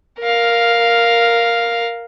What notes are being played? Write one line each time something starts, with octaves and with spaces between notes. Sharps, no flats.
A#4 F5